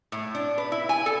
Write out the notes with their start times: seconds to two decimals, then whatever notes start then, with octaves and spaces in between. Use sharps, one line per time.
0.12 A2
0.35 D4
0.58 B4
0.72 E4
0.89 G#5
1.06 A4